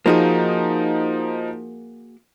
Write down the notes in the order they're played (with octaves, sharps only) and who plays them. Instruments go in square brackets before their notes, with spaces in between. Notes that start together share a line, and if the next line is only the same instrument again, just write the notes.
[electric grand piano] F3 D#4 [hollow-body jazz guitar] A#3 F#4 G#4